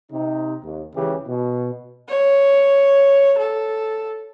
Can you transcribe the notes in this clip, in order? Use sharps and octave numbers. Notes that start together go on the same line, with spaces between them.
C3 D#4
D#2
C#2 C#3 E3 G4
B2
C#5
A4